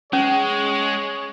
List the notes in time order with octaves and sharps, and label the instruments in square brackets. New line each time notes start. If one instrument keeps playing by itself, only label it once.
[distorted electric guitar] G#3 [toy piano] C#4 [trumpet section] G#4 C#5